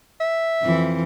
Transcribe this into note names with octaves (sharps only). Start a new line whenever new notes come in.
E5
F2 E3